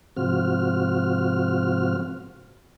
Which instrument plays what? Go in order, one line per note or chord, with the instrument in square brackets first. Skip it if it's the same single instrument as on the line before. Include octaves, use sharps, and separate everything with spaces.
[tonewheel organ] G#2 C3 F3 C4 F#4 F6